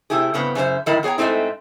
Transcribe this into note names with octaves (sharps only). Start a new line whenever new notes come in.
C3 A3 E4 G4 G#4
G2 C#3 B3 C4
F#2 C#3 D4 C5 E5
F#2 A2 D#3 E4 A#4
B3 G#4 C#5 G5 A#5
G#2 G#3 A3 C4 E4